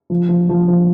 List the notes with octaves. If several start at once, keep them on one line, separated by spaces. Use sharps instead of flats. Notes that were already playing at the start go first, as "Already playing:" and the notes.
F3
F3
F3
F3